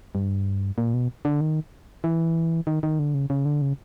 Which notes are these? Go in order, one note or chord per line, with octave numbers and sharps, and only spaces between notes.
G2
A#2
B2
D3
D#3
E3
D#3
D#3
D3
C#3
C#3
D3
C#3